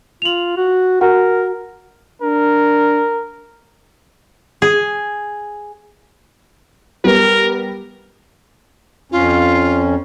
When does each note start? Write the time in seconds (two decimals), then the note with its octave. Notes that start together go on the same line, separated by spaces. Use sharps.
0.22 F4 F7 F#7
0.57 F#4
1.01 F#4 A#4 F#5
2.22 D4 A#4
4.62 G#4
7.04 G3 B3 A#4
9.12 F2 C#4 F4